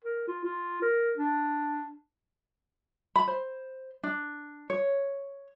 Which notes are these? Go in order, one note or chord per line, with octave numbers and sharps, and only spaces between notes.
A#4
F4
F4
A#4
D4
B5
C5
D4
C#5